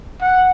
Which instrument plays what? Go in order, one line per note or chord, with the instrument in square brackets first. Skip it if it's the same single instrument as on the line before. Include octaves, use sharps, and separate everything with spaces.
[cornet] F#5